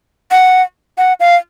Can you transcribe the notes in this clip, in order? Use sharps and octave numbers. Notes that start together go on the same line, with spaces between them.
F#5
F#5
F5